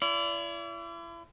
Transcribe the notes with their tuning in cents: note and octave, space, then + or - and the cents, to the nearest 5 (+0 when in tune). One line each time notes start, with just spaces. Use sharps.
E4 +40 D5 -30